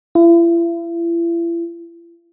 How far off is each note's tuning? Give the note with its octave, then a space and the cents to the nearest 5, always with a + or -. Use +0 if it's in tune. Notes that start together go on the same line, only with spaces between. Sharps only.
E4 +40